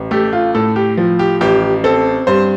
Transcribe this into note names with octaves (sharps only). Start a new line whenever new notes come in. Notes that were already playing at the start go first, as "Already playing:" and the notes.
Already playing: A1
A3 G4
F4
A2 A4
G4
F3
G4
A1 G4
C4 A4
G2 C5